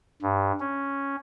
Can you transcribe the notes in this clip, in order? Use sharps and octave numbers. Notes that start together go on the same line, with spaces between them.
G2
C#4